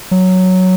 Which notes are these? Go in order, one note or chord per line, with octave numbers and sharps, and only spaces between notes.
F#3